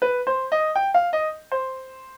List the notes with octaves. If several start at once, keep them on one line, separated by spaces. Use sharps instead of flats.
B4
C5
D#5
G5
F5
D#5
C5